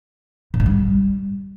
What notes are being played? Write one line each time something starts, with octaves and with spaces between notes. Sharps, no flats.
A#2
G#2
G3